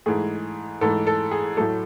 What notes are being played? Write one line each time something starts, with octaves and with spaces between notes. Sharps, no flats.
G#2 E3 A3 G#4
G#2 E3 A3 A4
A4
G#4
A2 F#3 A3 A4